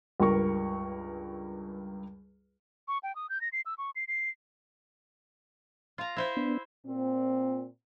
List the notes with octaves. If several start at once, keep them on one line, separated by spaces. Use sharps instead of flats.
C#2 G2 G3 A#4 C#6
C#6
G5
D#6
G6
A#6
C7
E6
C#6
C7
C7
F4 A#5
E4 C5 E5
B3 D4
A#2 C4